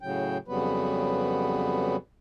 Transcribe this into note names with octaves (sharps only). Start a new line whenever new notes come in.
A2 C#3 F#3 G5
F2 C#3 F#3 G3 B3 B4